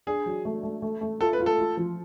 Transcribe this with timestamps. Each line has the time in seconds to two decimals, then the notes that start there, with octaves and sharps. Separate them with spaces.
0.07 D4 G#4
0.26 F#3
0.45 A3
0.63 A3
0.82 A3
1.01 A3
1.20 F4 A4
1.33 B4
1.40 F4
1.46 A4
1.58 F4
1.77 F3